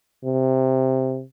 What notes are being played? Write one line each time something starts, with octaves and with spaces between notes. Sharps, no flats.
C3